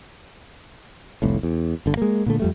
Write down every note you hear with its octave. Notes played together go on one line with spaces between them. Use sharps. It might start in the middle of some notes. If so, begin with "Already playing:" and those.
F1 C2 A2
E2
G1 D3
G#3 A#3
A#2 D3 A3
F2 G3 A3